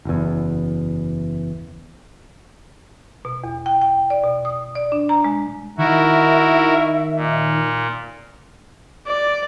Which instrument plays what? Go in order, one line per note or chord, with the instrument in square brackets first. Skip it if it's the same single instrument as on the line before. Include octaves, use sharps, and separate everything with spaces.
[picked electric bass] F#1 E2
[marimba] B2
E2
G5
G5
D5
B2
D#6
D5
D4
A#5
G#3
[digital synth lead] D#3 [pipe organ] E4 F#4 A#4 [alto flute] E5
[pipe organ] A#2
[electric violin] D5